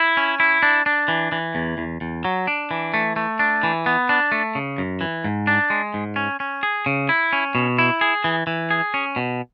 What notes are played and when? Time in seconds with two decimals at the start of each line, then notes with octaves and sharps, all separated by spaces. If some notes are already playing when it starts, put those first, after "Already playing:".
Already playing: E4
0.17 C#4
0.40 E4
0.63 D4
0.86 D4
1.08 E3
1.32 E3
1.55 E2
1.78 E2
2.01 E2
2.25 F#3
2.47 D4
2.71 E3
2.94 A3
3.16 A3
3.39 D4
3.63 E3
3.86 B3
4.09 D4
4.32 A3
4.55 C#3
4.78 F#2
5.01 E3
5.24 G#2
5.47 D4
5.70 G#3
5.94 G#2
6.16 C#4
6.40 C#4
6.63 G#4
6.86 C#3
7.09 E4
7.33 C#4
7.55 B2
7.79 E4
8.01 G#4
8.24 E3
8.47 E3
8.71 G#4
8.94 C#4
9.16 B2